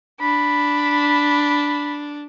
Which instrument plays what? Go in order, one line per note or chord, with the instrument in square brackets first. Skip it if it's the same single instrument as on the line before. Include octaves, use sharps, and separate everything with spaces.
[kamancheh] D4 [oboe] B5